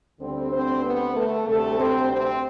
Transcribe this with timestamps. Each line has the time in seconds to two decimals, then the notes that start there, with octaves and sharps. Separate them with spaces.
0.20 D2 D3 G3 C4
0.51 C4 C5
0.83 B3 B4
1.15 A3 A4
1.47 D2 C3 G3 A3 A4
1.79 C4 C5
2.12 C4 C5